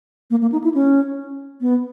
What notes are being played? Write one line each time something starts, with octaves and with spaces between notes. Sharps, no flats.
A#3
A#3
D#4
E4
C#4
B3